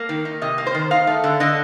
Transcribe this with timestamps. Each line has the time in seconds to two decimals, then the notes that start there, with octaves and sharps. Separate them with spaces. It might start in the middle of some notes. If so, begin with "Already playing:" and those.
Already playing: A#3
0.09 D#3
0.25 D#4
0.42 C3 D#5
0.58 A#3
0.66 C5
0.74 D#3
0.91 D#4 F5
1.07 A3
1.24 D3
1.40 D3 D#5